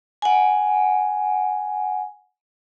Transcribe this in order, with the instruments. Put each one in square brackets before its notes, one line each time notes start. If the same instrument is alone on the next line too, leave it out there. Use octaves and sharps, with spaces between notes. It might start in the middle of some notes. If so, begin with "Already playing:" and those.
[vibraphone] F#5 G#5